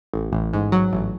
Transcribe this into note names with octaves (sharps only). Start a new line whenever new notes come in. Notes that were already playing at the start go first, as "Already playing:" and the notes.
A1
A1
G#2
F#3
A1